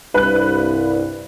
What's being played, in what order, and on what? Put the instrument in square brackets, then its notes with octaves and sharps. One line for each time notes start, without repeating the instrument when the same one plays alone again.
[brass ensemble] C2 G2 [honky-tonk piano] B4 F#6